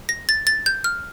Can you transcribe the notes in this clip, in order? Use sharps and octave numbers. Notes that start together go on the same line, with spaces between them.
A#6
A6
A6
G6
F6